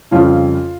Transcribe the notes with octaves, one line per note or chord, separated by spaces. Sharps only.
F2 C#3 G3 C#4 F4